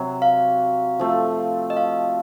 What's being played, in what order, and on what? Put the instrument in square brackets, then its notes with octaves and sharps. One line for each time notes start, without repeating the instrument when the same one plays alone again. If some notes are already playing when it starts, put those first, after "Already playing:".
Already playing: [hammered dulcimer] C3 F#3
[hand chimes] F5
[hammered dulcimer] F3 A3 C4
[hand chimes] D#5
F5